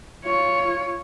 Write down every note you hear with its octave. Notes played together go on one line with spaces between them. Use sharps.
F4 C#5